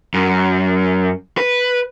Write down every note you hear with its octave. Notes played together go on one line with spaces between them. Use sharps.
F#2
B4